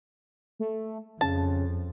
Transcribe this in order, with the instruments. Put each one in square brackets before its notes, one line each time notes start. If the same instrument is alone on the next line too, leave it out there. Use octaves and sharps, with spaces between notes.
[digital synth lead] A3
[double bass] F2 [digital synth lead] C#3 [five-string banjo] A5